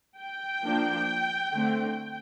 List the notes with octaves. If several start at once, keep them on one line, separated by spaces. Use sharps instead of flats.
G5
F3 A#3 D4
D3 A3 C4